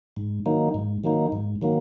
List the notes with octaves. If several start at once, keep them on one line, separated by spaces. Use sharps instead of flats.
G#2
D#3 F#3 A#3 D#4
G#2
D#3 F#3 A#3 D#4
G#2
D#3 F#3 A#3